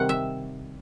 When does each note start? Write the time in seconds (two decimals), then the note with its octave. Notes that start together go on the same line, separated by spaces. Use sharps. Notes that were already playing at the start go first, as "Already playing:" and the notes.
Already playing: C3 D#3 G3 F#5
0.09 E5